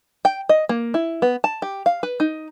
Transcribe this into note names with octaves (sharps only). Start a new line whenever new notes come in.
G5
D#5
A#3
E4
B3
A5
G4
F5
B4
D#4